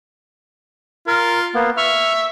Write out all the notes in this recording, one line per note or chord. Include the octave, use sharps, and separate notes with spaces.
F4 A#4
A#3 B3
E5 C#6 F6